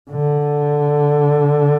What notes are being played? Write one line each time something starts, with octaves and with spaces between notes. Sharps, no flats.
D3